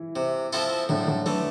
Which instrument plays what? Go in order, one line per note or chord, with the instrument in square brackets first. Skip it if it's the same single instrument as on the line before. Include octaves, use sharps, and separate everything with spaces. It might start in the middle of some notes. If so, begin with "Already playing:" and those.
Already playing: [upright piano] E3 E4
[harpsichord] C3
F3 C4 E4 A4
[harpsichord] A2 [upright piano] D3 D4
[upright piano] D3 D4
[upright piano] D3 D4 [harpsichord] E3 A3